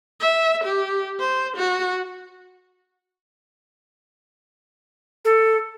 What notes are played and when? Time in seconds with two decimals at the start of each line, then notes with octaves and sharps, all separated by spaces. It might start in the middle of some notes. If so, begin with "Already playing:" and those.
0.20 E5
0.64 G4
1.20 C5
1.57 F#4
5.25 A4